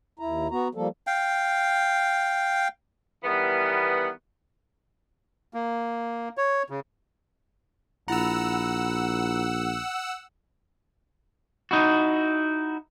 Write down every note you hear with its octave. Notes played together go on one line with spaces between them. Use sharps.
D#2 E4 A#5
B3 F#4 A#5
F3 G3 A#3 A4
F5 G5
D#3 E3 G3 B3
A#3
C#5
C#3
A#1 E4 F#5 A#5 E6
D#4 E4 F#4